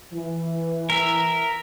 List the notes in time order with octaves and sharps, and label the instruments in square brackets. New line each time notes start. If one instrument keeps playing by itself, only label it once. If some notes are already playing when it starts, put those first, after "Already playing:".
[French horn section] E3
[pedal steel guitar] A#4 E5